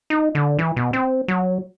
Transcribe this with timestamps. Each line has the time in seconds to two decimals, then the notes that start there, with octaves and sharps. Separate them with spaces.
0.10 D#4
0.35 D3
0.59 E3
0.76 B2
0.93 C4
1.28 F#3